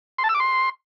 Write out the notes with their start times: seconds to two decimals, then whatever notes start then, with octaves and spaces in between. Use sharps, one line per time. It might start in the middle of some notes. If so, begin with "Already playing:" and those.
0.18 C6
0.24 A5
0.29 E6
0.35 D6
0.40 C6